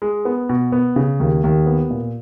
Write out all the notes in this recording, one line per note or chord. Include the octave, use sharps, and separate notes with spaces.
G#3
B3
B2
B3
C#3
D#2
D#2
B3
A#2